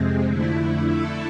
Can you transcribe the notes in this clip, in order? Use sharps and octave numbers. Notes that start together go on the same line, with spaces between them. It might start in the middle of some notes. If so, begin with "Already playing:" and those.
Already playing: F2 C3 G#3 C4
F2 D3 A3 E4
D3 A3 E4 A4